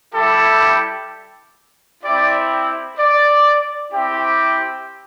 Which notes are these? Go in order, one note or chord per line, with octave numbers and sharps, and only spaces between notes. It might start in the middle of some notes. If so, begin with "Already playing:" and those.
G3 E4 G4 A4
C4 E4 G4 D5
D5
C4 E4 G4